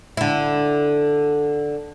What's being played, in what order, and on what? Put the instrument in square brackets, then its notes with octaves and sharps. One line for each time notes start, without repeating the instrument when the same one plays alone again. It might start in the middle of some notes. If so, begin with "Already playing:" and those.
[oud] D3 E4